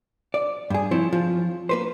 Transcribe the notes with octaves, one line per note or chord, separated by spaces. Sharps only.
D5
G2 G#4
F3 C4 E4 C#5
F3 F4
A#3 B4 C5